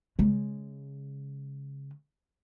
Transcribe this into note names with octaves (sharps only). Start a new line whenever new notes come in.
C#3 G#3